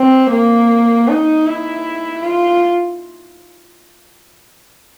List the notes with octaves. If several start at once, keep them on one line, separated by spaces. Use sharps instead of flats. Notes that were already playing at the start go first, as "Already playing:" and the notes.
Already playing: C4
A#3
D#4
E4
F4